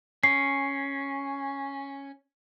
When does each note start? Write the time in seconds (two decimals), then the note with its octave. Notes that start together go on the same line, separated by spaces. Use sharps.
0.23 C#4 C7